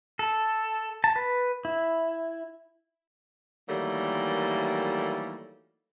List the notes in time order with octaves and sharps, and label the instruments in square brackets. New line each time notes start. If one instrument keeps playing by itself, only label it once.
[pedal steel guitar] A4
A5
B4
E4
[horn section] D#3 E3 F#3 G3 A3 A#3